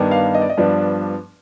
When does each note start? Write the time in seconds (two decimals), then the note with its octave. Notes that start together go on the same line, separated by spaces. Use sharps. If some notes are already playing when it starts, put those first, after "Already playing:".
Already playing: G2 D#3 B3 D4
0.11 F5
0.35 D#5
0.42 D5
0.50 D#5
0.57 G2 F3 B3 D4 D5